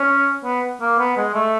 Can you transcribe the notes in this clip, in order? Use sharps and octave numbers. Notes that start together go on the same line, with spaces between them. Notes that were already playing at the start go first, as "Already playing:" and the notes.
Already playing: C#4
B3
A#3
B3
G#3
A3